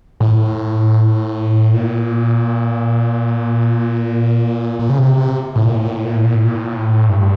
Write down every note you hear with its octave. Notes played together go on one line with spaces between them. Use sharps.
A2
A#2
A#2
C#3
C3
C3
A2
A#2
A2
A#2
A2
A#2
A2
A#2
A2
A#2
A2
A#2
A2
G2